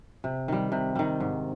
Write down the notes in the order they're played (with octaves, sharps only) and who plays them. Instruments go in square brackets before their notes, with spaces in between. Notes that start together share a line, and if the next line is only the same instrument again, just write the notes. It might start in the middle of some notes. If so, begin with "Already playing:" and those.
[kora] C3
D#3 G3
C3
D#3 G3
G#2